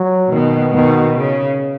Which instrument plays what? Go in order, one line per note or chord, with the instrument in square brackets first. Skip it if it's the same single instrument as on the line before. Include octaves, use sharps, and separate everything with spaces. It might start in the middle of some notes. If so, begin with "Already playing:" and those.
Already playing: [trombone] F#3
[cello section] B2 [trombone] D#3
[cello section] B2 [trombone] D#3
[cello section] C#3